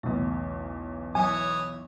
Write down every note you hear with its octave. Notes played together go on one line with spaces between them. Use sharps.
B1 E2 C#3 A3
E3 F#3 C#5 G#5 D#6